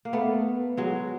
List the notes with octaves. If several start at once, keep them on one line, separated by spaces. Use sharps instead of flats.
A#3
A3 B3
F#3 G#3